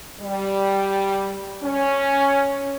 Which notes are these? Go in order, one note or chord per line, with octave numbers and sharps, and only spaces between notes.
G3
C#4